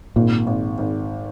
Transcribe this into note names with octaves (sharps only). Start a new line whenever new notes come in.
G#1 A#2
G#1
G#1